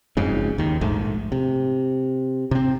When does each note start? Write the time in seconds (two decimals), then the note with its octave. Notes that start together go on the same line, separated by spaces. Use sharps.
0.17 F#1 F2 G#2 C#3
0.58 D#2 D#3
0.81 A#1 G#2 A3
1.32 C3
2.51 C3 C4